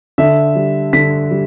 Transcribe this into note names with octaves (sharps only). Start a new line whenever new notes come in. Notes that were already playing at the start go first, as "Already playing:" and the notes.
D3 E5
G3
D3 B6
G3